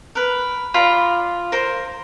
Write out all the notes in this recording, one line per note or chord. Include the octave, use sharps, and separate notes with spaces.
A#4 B4
F4 D5 A#5 B5
A#4 C5